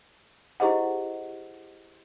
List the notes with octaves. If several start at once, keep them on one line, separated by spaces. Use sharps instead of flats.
E4 G4 G#4 C5 D#5 F#5